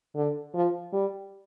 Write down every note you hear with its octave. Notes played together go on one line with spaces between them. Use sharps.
D3
F3
G3